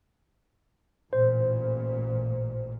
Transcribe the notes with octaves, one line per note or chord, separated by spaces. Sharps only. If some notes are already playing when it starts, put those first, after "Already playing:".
A1 A#2 C5